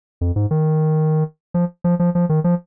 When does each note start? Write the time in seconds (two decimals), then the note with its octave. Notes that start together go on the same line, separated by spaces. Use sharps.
0.21 F2
0.36 G#2
0.51 D#3
1.54 F3
1.84 F3
1.99 F3
2.15 F3
2.29 D#3
2.44 F3